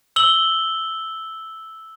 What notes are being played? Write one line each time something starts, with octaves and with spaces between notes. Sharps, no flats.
E6 F#7 G7